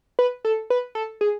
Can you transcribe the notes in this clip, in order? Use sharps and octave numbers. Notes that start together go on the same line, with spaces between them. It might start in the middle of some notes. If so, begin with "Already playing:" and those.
B4
A4
B4
A4
G#4